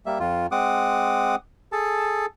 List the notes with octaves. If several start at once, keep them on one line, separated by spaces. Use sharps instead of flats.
G3 A#3 E5
F2 F4
G#3 C4 F#5 D6 D#6
G#4 A4 A5